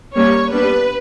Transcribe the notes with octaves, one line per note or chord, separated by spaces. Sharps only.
G3 A#3 C#4 C#5
G3 B3 D4 B4